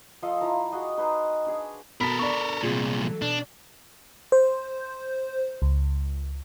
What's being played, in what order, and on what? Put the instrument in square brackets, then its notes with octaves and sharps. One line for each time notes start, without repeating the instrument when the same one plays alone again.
[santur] F3 A4 D#5 F5
F3 E4 A#5
F#4 G#4 D#5
D#4 G#4 B4 C5
D4 G#4 G#5
[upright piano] B2 B5 B6 [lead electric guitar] A4 A#4
[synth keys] B3 D4 [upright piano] D5 B5 C#6
[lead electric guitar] C2 A#2 [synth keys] C4 F4 G#4
[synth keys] E3 F#3 A4
[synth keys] B2 [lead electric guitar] D4
[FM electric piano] C5
C#2